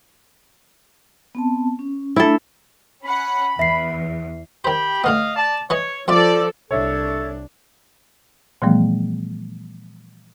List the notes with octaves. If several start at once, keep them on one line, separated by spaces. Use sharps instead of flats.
B3 C4 A5
C#4
A3 D4 E4 A4
C#4 F#5 B5
E2 E5 C7
D#3 G4 C5 G5 B5
A2 D3 B3 D#5 F5
D5 A5
E3 B4 C#5 D#5
F2 F3 F4 A4 D5 E5
C2 D4 A4 C#5 E5
A#2 E3 F3 G3 A3 B3